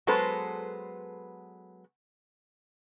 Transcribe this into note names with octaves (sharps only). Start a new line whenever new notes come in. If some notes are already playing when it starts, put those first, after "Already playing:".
F#3 G#3 B3 A4 B4 C5